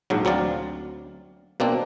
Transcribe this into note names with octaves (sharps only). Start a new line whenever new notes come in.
A#1 G#2 F#3
D2 F#3 C4 D5 F5
B2 A#3 C4 D4